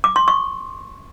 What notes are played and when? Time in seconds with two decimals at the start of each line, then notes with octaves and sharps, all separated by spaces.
0.04 D6
0.16 C6
0.28 C#6